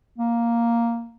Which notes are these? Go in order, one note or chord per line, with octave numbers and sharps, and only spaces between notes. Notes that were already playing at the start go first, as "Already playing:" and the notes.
A#3